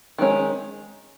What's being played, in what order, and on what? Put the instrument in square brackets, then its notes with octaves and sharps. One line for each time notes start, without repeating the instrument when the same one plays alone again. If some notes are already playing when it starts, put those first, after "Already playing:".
[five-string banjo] D#3 G#3 C#4